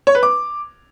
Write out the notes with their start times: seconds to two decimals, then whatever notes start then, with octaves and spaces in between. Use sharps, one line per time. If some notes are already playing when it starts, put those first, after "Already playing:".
0.07 C#5
0.15 B4
0.23 D6